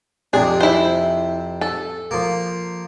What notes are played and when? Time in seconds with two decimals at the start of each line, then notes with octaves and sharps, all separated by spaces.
0.33 F2 C3 D4 G#4
0.61 E4 C5
1.61 A4
2.11 F3 A#3